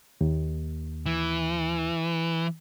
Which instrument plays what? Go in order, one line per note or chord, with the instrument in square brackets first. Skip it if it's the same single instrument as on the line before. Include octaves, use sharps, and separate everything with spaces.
[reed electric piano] D#2
[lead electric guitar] E3